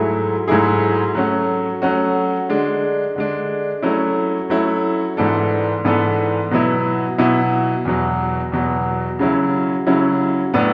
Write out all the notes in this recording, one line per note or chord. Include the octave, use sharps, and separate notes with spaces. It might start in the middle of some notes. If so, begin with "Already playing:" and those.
Already playing: G#2 F#3 A3 E4 G#4
G#2 F#3 A3 E4 G#4
F#3 A3 C#4 F#4
F#3 A3 C#4 F#4
D3 G#3 D4
D3 G#3 D4
F#3 A3 C#4 E4
F#3 A3 C#4 E4
G#2 E3 B3 D4 A4
G#2 E3 B3 D4 A4
B2 F#3 B3 E4
B2 F#3 B3 E4
E2 B2 F#3
E2 B2 F#3
C#3 F#3 C#4 E4
C#3 F#3 C#4 E4
A2 F#3 B3 D4